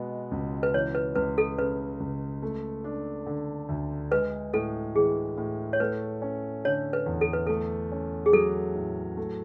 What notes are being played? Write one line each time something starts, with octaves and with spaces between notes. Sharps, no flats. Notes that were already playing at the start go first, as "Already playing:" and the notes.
Already playing: B2 G#3 B3
C#2
B4
E3 C#5
B4
C#2 B4
A4
C#3 B4
C#2
A3
D4
D3
D2
G#3 B4
A2 A4
E3 G#4
A2
C#5
A3 B4
C#4
D3 C#5
B4
E2
A4
B4
A3 A4
C#4
G#4
F#3 A4
A2
A3